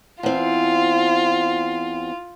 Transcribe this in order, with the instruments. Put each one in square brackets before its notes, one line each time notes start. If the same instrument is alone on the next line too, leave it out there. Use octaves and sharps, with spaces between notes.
[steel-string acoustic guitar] E2 C4 [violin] F4